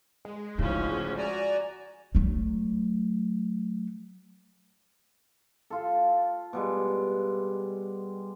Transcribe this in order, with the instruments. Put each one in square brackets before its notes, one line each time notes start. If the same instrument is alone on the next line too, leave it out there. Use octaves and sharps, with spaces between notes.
[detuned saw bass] G#3
[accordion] D2 G#2 C#3 [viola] F3 C#4 [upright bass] E4
[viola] F#4 [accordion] D5 G#5 A#5
[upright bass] F#3 A3
[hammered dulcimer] F4 A4
B2 G3 G#3